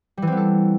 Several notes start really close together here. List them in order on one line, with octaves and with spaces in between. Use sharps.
G3 E3 C4 B3 A4